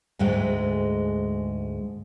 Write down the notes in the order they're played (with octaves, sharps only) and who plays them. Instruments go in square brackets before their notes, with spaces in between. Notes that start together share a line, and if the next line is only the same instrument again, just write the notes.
[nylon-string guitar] D2 G#2 G#3 A3 G5